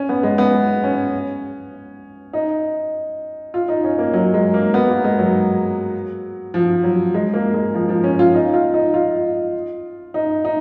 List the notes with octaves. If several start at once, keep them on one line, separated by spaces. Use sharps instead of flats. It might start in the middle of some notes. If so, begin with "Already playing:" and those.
Already playing: C#4
B3
G#3
B3
C#4
D#4
F4
D#4
C#4
A#3
F#3
G#3
A#3
B3
A#3
G#3
F#3
F3
F#3
G#3
A#3
G#3
F3
F3
C#4
F4
D#4
F4
D#4
F4
D#4
D#4